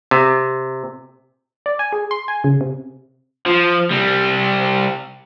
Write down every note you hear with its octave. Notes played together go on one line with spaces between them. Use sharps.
C3
D5
G#5
G#4
C6
G#5
C#3
C3
F3
C3 G3